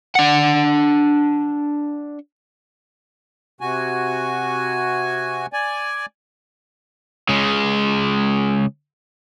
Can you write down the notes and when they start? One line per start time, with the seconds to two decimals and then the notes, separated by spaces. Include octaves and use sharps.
0.15 D4 F#5
3.61 C3 F#4 G#5
5.53 D5 G#5
7.29 C#3 G#3